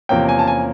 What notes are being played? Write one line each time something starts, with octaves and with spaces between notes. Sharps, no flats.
E2 C3 F3 A#3 C#4 G5
G#5
A5
G#5